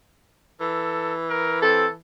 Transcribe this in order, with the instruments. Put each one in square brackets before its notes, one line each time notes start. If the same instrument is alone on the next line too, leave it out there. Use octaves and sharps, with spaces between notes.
[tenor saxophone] E3 [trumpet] A4
[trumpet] A#4
[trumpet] C4 [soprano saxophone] A4